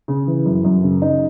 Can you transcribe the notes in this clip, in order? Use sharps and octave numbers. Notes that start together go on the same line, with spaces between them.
C#3
E3
F#2
F#2
C#3
D#4